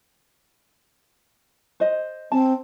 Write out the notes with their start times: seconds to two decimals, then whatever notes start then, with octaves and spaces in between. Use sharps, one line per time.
1.80 C5 D#5
2.32 C4 A5